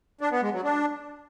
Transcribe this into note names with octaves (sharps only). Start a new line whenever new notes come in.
D4
B3
G#3
F#3
D4